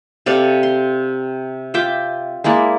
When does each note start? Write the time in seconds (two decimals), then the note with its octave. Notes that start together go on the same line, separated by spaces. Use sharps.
0.26 C3 A4 D5 F5
0.63 C6
1.74 F4 E5 G5 D6
2.44 G#3 A#3 E4 D5